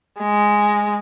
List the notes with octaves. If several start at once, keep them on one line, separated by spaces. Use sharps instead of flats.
G#3